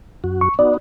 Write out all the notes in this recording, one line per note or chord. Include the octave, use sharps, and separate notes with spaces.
F#2 F#4
C#6
B3 D#4 F#4 D5